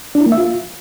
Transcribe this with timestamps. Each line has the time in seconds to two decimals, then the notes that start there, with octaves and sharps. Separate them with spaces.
0.15 D4
0.21 E4
0.26 A#3
0.32 E5
0.38 F4